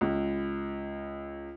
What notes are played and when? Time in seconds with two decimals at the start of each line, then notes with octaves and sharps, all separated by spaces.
0.01 C#2